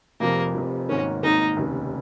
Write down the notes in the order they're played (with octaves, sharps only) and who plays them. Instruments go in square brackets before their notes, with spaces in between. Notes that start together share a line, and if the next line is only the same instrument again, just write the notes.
[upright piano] F1 F2 C3 F3 [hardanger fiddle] A#3
[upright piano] F1 F2 C3 F3
[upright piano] G#1 G#2 D#3 A#3 [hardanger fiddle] C#4
[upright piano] G#1 G#2 D#3 A#3 [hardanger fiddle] D#4
[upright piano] F1 D#2 C#3